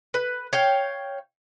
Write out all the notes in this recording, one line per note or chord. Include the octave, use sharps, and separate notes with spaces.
B4
C#5 F5 G5